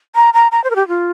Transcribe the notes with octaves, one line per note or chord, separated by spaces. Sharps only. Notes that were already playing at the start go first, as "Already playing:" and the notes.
A#5
A#5
A#5
C5
A#4
G4
F4